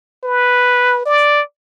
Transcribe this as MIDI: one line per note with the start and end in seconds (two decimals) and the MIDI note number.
0.24 1.04 71
1.06 1.41 74